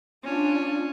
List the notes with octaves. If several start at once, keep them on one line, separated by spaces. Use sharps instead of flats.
C#4 D4 F4